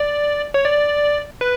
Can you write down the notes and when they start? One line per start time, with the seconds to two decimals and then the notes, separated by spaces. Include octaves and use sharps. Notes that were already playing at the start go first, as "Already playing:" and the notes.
Already playing: D5
0.54 C#5
0.64 D5
1.41 B4